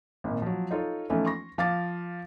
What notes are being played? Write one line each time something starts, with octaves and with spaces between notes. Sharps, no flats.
G#1 A#2
F3 F#3
D#4 F4 A4 C#5
E3 F3 A3 B3 C#4 D#4
C6 C#6 A#6
F3 F5 D6 A6